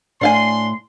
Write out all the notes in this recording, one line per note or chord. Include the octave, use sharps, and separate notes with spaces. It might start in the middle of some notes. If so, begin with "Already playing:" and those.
A2 D4 F5 G#5 C6